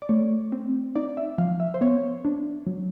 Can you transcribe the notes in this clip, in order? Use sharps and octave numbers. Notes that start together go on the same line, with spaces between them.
D5
A3 C#5
C4
D#4 D5
E5
F3 F5
E5
C5
B3 C#5
D4
F#3